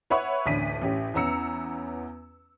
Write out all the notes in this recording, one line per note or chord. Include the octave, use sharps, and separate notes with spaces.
B4 C#5 E5 F#5 B5 C#6
A1 D2 D4 B6 D#7
A1 C#4 G4
E2 B3 C#4 A#5 E6 C#7